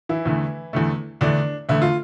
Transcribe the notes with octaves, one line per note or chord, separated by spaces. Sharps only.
E3 E4
E2 D3 A3
E2 D3 A3
E2 D3 A3 D4
E2 D3 A3 E4
F4